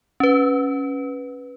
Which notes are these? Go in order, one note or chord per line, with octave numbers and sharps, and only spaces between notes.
C#4 B4